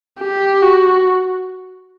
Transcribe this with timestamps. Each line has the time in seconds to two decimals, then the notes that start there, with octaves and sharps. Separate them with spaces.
0.20 G4
0.62 F#4